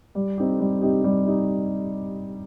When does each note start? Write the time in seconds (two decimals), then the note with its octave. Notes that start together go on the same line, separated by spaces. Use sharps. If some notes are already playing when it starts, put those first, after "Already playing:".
0.15 G3
0.38 C4 D#4 G4
0.60 G3
0.82 C4 D#4 G4
1.04 G3
1.26 D#4 G4